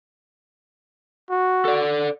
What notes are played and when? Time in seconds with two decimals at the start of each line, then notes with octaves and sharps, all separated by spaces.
1.30 F#4
1.65 A4 D5